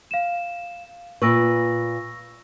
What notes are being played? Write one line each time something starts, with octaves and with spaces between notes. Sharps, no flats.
F5 E7
A#2 B4 C#6 E6 A#6